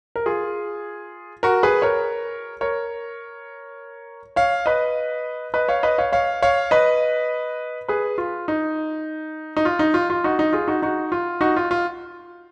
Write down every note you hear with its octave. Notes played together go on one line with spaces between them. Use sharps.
A#4
F4 G#4
F#4 A#4
G#4 B4
A#4 C#5
A#4 C#5
C#5 F5
B4 D#5
B4 D#5
C#5 F5
B4 D#5
C#5 F5
C#5 F5
C#5 F5
B4 D#5
G#4 B4
F4
D#4
D#4
F4
D#4
F4
F4
D#4 F#4
D#4
F4 G#4
D#4 F#4
D#4 F#4
F4
D#4 F#4
F4
F4